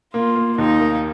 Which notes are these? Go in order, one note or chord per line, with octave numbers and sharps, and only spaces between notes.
A#3 F4
A#3
D#2 D#4
A#3